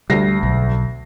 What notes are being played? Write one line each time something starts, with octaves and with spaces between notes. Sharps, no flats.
D2 G3 A#6 C7
B1